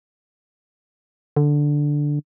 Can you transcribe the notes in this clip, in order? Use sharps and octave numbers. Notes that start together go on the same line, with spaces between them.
D3